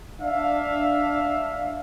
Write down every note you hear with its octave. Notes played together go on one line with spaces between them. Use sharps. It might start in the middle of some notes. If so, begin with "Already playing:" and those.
D4 E5 F5